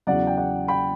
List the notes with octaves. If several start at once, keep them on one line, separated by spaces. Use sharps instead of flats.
E2 C#3 F#3 D5 F#5
G5
D5 F#5
G5 B5